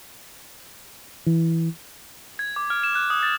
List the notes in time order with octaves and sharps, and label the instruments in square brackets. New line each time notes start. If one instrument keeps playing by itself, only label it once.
[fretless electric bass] E3
[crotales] G#6
D6
F6
E7
F#6
D#6
A6